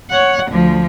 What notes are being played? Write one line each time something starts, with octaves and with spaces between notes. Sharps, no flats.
C#5 F#5
D2 F3